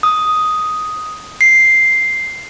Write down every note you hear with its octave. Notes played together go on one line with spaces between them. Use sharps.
D#6
C7